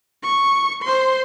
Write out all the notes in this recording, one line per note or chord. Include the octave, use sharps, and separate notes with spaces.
C#6
C5 C6